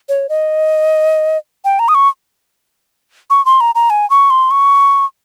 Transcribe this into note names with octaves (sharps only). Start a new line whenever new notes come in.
C#5
D#5
G5
A#5
D#6
C#6
C#6
C6
A#5
A#5
G#5
C#6
C6
C#6